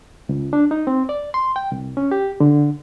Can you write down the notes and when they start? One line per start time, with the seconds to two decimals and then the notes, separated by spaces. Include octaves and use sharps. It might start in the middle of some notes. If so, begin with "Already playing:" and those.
0.29 C#2
0.53 D4
0.71 D#4
0.87 C4
1.09 D5
1.34 C6
1.56 G5
1.72 C2
1.97 C#4
2.11 G4
2.40 D3